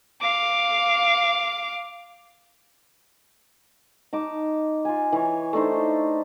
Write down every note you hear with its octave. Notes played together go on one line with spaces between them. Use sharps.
F5 D6
D#4 A5 D6
F4 G#5
E3 C#5
A3 D4 D#4 C5